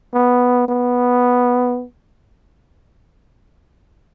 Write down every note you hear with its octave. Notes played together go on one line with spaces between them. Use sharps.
B3
B3